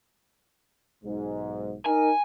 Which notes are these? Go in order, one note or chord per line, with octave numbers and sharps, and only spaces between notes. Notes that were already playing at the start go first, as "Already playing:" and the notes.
B1 G#2
D#4 A#4 G#5